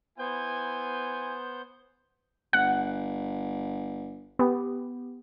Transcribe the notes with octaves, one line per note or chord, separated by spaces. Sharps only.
B3 E4 C5 G#5 G6
G1 F#5
B3 G4